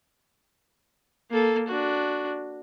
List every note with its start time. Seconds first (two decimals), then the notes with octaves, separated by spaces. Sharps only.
1.30 A#3 A4
1.68 D4 F#4